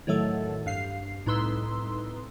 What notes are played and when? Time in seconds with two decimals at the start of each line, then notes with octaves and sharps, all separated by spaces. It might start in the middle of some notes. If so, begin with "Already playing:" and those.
0.07 A2 D#3 F#3 A3 A4
0.66 G2 F5 C7
1.26 C2 A2 D#4 B4 C6 E6